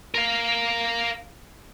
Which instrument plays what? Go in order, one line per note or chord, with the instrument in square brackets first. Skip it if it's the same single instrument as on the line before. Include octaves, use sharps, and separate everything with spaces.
[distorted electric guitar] A#4 F5